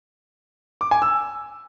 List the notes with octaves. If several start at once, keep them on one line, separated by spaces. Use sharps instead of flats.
D6
G#5
E6